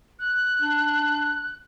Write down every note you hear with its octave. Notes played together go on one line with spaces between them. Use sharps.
F#6
D4